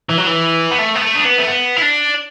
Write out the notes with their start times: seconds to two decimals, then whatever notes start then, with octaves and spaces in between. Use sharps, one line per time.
0.09 E3
0.18 F#3
0.27 E3
0.71 B3
0.78 A3
0.95 B3
1.02 A3
1.15 D4
1.25 B3
1.38 A3
1.47 B3
1.76 E4
1.82 D4